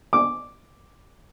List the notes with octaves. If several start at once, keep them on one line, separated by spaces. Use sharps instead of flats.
D6